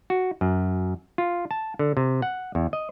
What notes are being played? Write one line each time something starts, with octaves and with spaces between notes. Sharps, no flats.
F#4
F#2
F4
A5
D3
C3
F#5
E2
D#5